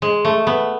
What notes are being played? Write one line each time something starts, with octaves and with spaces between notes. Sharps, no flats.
G#3
A3
B3